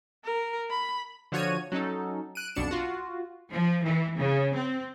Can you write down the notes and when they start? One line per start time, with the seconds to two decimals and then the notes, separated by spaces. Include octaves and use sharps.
0.25 A#4
0.70 B5
1.32 D3 F3 F#4 C#5 G#6 D#7
1.72 F#3 C#4 D#4 A4
2.35 F#6 D7 D#7
2.55 B1 F2 B2 D4 C#7 E7
2.71 F4 F#4
3.52 F3
3.84 E3
4.18 C#3
4.55 C4